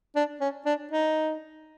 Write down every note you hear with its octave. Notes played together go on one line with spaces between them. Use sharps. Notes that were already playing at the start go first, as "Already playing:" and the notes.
D4
C#4
D4
D#4